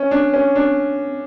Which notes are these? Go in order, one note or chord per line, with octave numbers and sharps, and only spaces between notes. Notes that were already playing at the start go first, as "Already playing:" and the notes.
Already playing: C#4
D4
C#4
D4